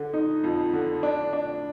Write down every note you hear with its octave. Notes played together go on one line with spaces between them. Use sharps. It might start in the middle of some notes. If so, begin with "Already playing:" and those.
Already playing: D3
D#4
F2
D3
D4
D4